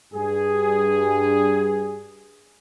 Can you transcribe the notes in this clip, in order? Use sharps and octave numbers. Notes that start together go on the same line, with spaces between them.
G2 G#4